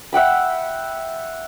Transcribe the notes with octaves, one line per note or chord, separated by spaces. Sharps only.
E5 F#5 G5 B5